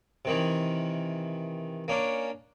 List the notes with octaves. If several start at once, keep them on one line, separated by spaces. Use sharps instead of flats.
C3 D#3 E3
A#3 C#4 D4